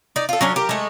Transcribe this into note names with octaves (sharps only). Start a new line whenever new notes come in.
D#4 D5
F4 A4
F#3 C#4 D4
G4 A#4
G#3 A3